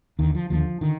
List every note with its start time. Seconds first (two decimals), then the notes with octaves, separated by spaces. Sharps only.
0.19 D#2 D3 D#3
0.35 F3
0.50 D#2 D3 F3
0.81 D3 D#3